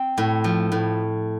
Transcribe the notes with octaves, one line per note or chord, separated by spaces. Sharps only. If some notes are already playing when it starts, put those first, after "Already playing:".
Already playing: C4
A2
F3
A2